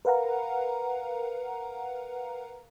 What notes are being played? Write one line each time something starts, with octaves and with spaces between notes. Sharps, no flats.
A#4 B4 F5 F#5 A#5